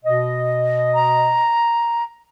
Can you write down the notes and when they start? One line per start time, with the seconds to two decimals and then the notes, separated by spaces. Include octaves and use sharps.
0.05 B2 D#5
0.94 A#5